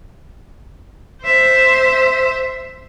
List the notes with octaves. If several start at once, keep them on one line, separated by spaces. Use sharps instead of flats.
C5 E5